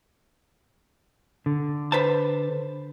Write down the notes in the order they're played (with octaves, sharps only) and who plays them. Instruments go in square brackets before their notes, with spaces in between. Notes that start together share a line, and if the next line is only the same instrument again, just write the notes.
[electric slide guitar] D3
[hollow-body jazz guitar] B4 C5 A5